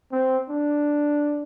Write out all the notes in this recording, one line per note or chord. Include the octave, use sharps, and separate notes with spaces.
C4
D4